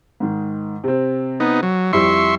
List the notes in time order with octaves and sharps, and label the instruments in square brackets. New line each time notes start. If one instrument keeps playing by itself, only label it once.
[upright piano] G#2 D#3
C3 C4
[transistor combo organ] B3 D#4
F#3
[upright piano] F2 G3 E4 [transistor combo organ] E5 C6 C#6